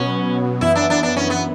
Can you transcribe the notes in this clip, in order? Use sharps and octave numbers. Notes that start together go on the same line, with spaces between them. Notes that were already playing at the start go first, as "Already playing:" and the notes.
Already playing: B2 F#3 B3 C#4
F#2 E3 B3 E4
D4
D4
D4
C#4
B3